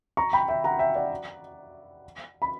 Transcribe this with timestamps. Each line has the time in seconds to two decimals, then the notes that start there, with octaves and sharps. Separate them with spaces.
0.17 A#5 C#6
0.33 G5 B5
0.48 E5 G5
0.64 F#5 A#5
0.79 E5 G5
0.95 D5 F#5
2.42 B5